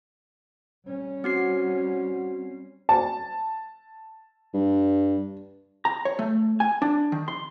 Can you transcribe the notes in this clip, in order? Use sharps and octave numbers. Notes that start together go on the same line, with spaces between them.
G3 C#4
C4 F#4 C7
A5
G2
A#5
C#5
A3
G#5
D4
D#3
C6